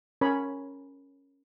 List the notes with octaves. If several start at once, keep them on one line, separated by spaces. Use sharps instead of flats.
C#4 A#4 C#5 G#5 B5